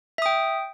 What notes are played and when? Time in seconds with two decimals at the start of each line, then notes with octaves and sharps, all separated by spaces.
0.18 E5
0.22 D#6
0.26 G5